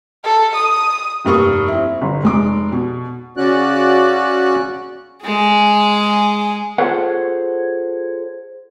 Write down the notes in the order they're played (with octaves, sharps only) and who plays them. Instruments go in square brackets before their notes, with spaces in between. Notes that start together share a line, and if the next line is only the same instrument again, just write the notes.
[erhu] A4
D#6
[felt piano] F1 G2 A#3 C#6 D#6
C4 E4
G1
F1 G#3 D6
B2
[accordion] C#3 C#4 F#4 D5 F#6
[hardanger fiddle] G#3 G#4
[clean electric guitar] F4 G#4 A4 C5 C#5 F#5